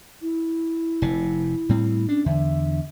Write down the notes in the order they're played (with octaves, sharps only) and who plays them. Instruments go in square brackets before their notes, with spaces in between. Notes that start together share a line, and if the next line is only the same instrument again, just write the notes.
[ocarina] E4
[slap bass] F1 C3
A2 G3 C4
[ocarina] C#4 [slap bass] D4
[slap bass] E2 D3 [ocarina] E5